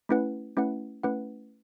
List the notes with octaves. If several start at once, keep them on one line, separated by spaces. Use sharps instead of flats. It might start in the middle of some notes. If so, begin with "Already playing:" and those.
A3 C#4 E4 B4 F#5
A3 C#4 E4 B4 F#5
A3 C#4 E4 B4 F#5